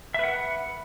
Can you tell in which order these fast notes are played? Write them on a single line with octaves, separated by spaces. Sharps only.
E5 B4 F#5